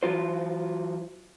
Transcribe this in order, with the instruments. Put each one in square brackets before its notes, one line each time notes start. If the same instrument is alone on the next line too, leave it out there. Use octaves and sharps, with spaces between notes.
[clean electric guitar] E3 F#3 F4 C5